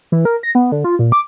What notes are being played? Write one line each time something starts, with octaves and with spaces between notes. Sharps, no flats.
E3
A#4
A#6
B3
D3
F4
A#2
D6